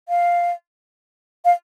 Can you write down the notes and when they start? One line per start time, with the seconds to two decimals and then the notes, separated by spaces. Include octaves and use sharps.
0.09 F5
1.45 F5